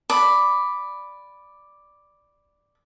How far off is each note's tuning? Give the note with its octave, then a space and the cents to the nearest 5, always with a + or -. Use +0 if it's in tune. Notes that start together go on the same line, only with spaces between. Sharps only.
D5 +0 B5 +0 D6 +0